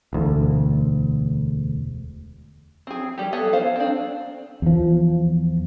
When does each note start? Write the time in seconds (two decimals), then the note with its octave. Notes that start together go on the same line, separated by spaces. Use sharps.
0.13 E1 D2
2.87 C4 G#4
3.18 G3 G4
3.33 B3 G#4 A4
3.53 C5 F5
3.76 C4 D4
4.62 E2 F3